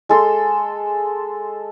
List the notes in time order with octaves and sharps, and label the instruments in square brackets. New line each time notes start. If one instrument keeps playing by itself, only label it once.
[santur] G#3 A4 C6